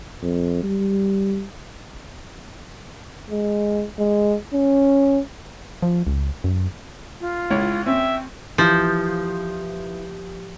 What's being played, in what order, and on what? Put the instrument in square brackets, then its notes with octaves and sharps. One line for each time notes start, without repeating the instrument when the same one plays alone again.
[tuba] F2
G3
[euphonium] G#3
G#3
C#4
[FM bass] F3
C#2
F#2
[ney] F4
[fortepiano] C#2 E4 C#5
[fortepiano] C4 C#4 [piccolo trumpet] E5 [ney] G5
[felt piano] E3 [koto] F3 [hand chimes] G4 D#6 G6